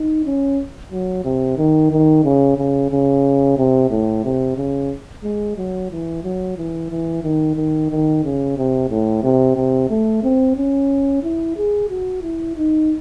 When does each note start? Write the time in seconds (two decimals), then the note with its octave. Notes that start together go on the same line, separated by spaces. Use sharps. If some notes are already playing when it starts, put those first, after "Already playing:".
Already playing: D#4
0.25 C#4
0.92 F#3
1.24 C3
1.57 D#3
1.91 D#3
2.24 C#3
2.58 C#3
2.91 C#3
3.58 C3
3.91 A2
4.24 C3
4.57 C#3
5.23 G#3
5.57 F#3
5.91 E3
6.24 F#3
6.57 E3
6.90 E3
7.24 D#3
7.56 D#3
7.90 D#3
8.24 C#3
8.57 C3
8.90 A2
9.23 C3
9.56 C3
9.90 A3
10.23 C4
10.56 C#4
11.23 E4
11.57 G#4
11.89 F#4
12.23 E4
12.56 D#4